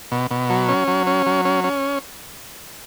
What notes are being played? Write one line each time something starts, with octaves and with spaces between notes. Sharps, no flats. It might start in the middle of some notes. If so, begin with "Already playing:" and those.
B2
B2
F#3
C#4
F#3
C#4
F#3
C#4
C#4